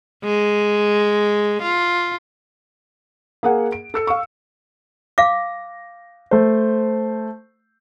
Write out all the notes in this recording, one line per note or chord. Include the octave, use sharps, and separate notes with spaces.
G#3
F4
A#3 G#4 F#5
D7
A4 E6 C#7
F5 C#6
F5 D6 A#6
A3 C5